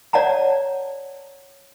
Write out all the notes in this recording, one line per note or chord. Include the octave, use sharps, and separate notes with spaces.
C#5 D5 F#5 A5 A#5